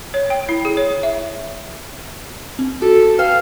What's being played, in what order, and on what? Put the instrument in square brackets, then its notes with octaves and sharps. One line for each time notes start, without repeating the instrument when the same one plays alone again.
[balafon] C#5
G5
E4
G#4
C#5
E5
[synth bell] C4
[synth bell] F#4 [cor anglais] A4
[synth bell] B4 G5 [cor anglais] F5